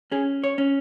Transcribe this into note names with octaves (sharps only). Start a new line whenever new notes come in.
C#4 G#4
C#5
C#4